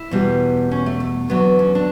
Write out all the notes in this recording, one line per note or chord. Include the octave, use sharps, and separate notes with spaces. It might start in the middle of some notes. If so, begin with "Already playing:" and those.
Already playing: E4
E2 B2 G3
C#4
A3
A3
E2 D3 F#3 B3
C#4
D4